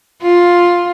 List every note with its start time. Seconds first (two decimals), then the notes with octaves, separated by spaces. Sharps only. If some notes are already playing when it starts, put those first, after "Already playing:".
0.22 F4